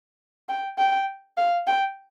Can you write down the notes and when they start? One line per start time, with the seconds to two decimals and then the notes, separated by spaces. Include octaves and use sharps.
0.49 G5
0.78 G5
1.37 F5
1.67 G5